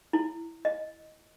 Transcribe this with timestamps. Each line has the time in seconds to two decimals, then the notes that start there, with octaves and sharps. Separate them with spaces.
0.13 E4
0.65 D#5